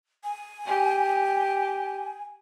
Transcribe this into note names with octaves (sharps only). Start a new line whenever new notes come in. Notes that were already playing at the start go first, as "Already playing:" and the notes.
G#5
G4